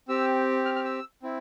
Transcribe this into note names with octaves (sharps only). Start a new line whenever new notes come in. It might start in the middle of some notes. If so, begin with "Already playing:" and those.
C4 G4 E6
F6
F6
E6
C4 E4